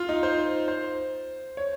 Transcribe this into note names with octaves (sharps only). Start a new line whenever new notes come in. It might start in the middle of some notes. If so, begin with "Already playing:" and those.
Already playing: F4
D#4
C5
C5
C#5